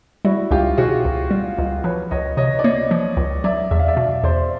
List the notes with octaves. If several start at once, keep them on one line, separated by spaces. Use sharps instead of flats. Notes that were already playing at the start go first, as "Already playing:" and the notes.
G3 E4 F#4
C#2 F4 G4
B2 F#4 G#4
C#2
G3
C#2
F3 B4 C#5
C#2 C#5 D#5
C3 C#5 D#5
D5
A#3 C#5 D#5
F3
C#2
F#3 D5 E5
E2 E5
F5
D5 E5
B2
E2 C5 D5